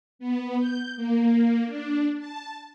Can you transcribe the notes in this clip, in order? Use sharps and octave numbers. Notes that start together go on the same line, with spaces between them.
B3
G6
A#3
D4
A5